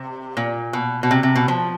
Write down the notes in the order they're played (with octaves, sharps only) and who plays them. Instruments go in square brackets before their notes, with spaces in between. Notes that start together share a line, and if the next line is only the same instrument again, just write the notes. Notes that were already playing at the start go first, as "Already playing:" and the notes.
Already playing: [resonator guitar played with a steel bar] C3
A#2
B2
B2
C3
C3
B2
F3